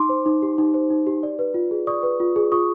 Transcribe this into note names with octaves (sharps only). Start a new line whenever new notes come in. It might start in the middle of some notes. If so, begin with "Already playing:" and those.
Already playing: D#4 C6 D6
C5
D#4
G4
D#4
C5
D#4
G4
D5
B4
F4
G#4
D5 C#6 D#6
B4
F4
G#4
F4 C#6 D#6